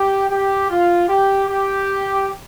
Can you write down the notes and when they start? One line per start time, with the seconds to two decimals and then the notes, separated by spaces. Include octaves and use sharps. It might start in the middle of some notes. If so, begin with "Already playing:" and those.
Already playing: G4
0.30 G4
0.70 F4
1.08 G4
1.48 G4